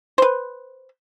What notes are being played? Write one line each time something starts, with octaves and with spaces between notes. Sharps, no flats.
B4 C5